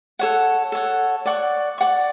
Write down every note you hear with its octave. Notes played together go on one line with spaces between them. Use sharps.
A4 C#5 F#5
A4 C#5 F#5
D5 F#5 C#6
D5 F#5 C#6